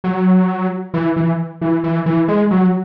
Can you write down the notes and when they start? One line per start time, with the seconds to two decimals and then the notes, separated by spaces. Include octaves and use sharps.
0.04 F#3
0.94 E3
1.16 E3
1.61 E3
1.84 E3
2.06 E3
2.28 G#3
2.51 F#3